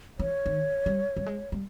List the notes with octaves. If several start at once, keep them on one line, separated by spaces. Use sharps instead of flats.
E3 C#5
D#3
G3
G3
G#3
G3